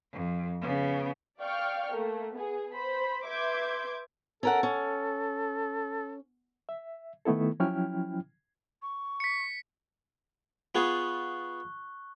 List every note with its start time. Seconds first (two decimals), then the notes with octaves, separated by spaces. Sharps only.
0.12 F2
0.62 C#3 B3
1.40 D5 F5 G5 C#6 F6
1.92 A3 A#3
2.33 B3 G#4
2.74 C5 B5
3.25 B4 E5 C6 D6 G6 G#6
4.43 C#4 A4 A#4 F#5
4.63 C#4
6.69 E5
7.25 D#3 A3 B3 E4 A4
7.60 F3 F#3 C#4 E4 G5 F6
8.82 C#6
9.20 B6 C#7
10.75 B3 F4 G#4 C#6 F#6 G7